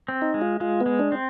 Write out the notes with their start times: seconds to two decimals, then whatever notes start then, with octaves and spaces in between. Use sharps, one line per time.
0.08 C4
0.22 D#4
0.34 G#3
0.41 F4
0.60 G#3 F4
0.81 B3
0.86 G#3
0.99 D4
1.12 C4